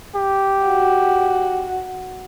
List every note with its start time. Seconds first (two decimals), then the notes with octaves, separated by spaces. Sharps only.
0.15 G4
0.67 F#4